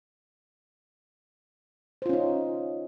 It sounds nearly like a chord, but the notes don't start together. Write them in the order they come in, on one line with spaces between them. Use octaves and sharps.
C5 F4 C#4 D#4